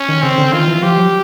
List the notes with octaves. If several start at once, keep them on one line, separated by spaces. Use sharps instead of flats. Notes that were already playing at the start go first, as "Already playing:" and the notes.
Already playing: C#4
D#3
C#3 C4
D3
D#3 F4
E3
F3 G4
F#3